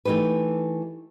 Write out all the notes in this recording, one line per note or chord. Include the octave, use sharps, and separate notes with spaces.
E3 A3 D#4 G4 B4